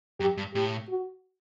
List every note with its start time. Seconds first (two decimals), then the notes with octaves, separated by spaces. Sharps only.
0.20 F#2 G4
0.37 G2
0.54 A2 G4
0.89 F#4